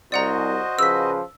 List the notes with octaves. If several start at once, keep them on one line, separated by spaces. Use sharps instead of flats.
C2 F#4 C5 D5 D#5 F#5 A#5
C#3 F3 B4 E6 B6